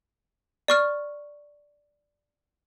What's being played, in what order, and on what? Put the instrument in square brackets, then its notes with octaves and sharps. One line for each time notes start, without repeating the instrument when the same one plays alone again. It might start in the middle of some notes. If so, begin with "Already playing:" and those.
[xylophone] D5 C#6 F6